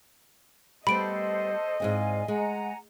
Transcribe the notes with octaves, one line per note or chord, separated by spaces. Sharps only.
G3 A3 B3 A4 C5 D#5 B5 D7
G#2 G#3 C4 D5 F5 G#5
G#3 F#5 G#5 A#5